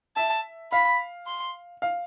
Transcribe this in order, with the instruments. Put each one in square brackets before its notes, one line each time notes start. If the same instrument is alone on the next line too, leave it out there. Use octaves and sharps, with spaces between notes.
[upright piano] E5 [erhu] A5
[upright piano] F5 [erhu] B5
[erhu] C6
[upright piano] F5